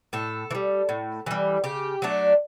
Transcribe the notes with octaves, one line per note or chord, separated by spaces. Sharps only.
A2 A4
E3
G3
A2
E3 G3
C#3 G4
F#3 A3 D4